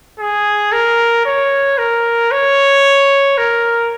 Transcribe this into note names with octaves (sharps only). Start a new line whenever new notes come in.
G#4
A#4
C#5
A#4
C#5
A#4